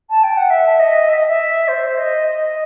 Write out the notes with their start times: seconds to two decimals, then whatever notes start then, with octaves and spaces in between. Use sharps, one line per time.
0.10 A5
0.24 G5
0.37 F#5
0.50 E5
0.79 D#5
1.09 E5
1.18 D#5
1.28 E5
1.68 C5
1.98 D#5
2.27 D#5